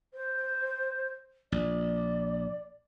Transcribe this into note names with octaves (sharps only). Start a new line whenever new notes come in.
C5
A#1 D5